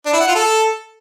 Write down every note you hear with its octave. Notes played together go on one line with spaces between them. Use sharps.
D4
E4
F#5
F4
A4